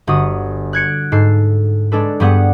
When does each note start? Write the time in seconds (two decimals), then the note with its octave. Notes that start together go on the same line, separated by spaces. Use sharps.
0.07 G1 F#4 D#6
0.73 F#6 G#6 C#7 D7
1.12 G#2 A4 C7
1.92 G#3 D4 A4 B4
2.20 G2 G3 B3 G#4 F#5